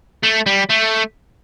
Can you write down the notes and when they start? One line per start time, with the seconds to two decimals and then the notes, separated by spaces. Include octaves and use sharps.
0.24 A3
0.46 G3
0.69 A3